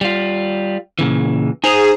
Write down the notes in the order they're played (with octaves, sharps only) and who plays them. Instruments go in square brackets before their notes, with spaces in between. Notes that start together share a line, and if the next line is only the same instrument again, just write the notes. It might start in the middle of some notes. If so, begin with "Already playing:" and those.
[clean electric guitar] G3 F4
A#2 C#3 E3
[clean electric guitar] D#4 C5 A#5 [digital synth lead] G#4